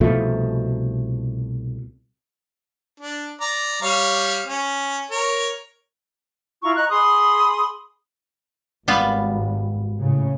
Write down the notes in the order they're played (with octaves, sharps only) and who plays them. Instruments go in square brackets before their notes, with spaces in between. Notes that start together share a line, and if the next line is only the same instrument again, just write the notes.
[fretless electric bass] C2 B2 F3 A3
[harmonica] D4
D5 A#5
G3 C#5 F5
C#4
A#4 C#5
[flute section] E4 F4 A#5 C#6
D#5 A#5 C#6 F#6
G#4 B5 C6 D#6
[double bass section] G#1 [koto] G3 B3 F4
[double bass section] A2 C#3